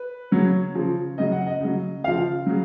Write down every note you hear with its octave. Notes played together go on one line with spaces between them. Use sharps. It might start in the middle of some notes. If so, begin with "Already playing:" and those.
Already playing: B4
C#3 F#3 C#5
C#3 F3
C#3 F#3 D#5
F#5
D#5
C#3 F#3
C#3 F3 F5
C#3 F#3